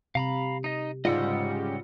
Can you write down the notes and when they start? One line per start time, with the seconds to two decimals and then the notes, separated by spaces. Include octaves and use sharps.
0.15 C3 F5 A#5 B5
0.64 D#4 D#5
1.05 G#2 C#3 G3 F4 D#5 F#5 E6